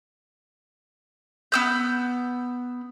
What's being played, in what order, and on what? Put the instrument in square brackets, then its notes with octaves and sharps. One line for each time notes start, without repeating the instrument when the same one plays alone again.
[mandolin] B3 E6 G6